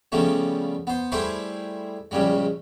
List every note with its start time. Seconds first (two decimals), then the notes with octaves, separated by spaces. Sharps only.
0.12 C#3 F3 G3 A3 B3
0.87 B3 C5
1.12 G3 A3 E4 G#4 B4 C5
2.11 A#1 G2 C#3 G3 G#3